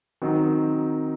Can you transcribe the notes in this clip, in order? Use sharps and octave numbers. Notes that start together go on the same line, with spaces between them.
D#3 F#3 C4 D#4